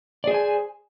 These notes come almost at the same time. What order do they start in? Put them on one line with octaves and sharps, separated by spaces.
D5 G#4 C5 G#5